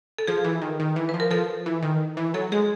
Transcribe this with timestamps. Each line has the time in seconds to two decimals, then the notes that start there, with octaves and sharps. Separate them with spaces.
0.19 A4
0.27 F3 G#4
0.44 E3
0.62 D#3
0.80 D#3
0.96 E3
1.09 F3 B4
1.20 A#4
1.31 F3 A4
1.66 E3
1.82 D#3
2.17 E3
2.34 F#3 A4
2.52 G#3 G#4